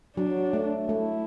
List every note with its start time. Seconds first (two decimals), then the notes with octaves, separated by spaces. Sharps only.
0.17 F#3 D4
0.53 A3
0.89 A3 E4